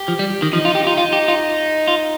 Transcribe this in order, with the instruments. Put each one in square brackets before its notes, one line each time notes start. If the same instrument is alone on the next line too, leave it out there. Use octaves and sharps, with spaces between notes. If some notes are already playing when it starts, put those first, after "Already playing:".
Already playing: [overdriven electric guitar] G4
[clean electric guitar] F3
G3
D#3
[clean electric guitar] F3 [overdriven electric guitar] D#4
[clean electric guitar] F4
[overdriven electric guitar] D#4
[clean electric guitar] G4
[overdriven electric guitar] D#4 [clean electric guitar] F4
[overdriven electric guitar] D#4 [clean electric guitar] F4
[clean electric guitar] G4
F4
F4